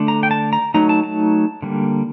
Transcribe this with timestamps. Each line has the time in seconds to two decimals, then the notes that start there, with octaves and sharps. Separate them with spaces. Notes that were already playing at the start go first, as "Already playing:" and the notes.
Already playing: D3 A3 D4
0.08 A#5
0.23 G5
0.31 A5
0.53 A#5
0.74 F#3 A3 D#4 A#5
0.89 A5
1.03 A5
1.62 D3 G3 A#3